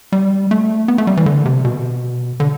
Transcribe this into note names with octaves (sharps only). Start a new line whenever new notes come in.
G3
A3
B3
A3
G3
E3
D3
C3
B2
D3